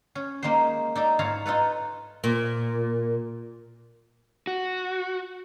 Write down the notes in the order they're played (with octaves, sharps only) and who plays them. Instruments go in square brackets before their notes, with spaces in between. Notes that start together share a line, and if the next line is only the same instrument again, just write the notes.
[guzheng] C#4
G#3 A#3 D#4 G4 C5
D#4 D5 E5
G#2 E4 F4 A4 C#5 A#5
D#4 F4 A4 B4
[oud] A#2
[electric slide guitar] F#4